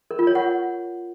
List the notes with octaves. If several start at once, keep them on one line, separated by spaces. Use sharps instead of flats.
A#4
F4
C#5
F#5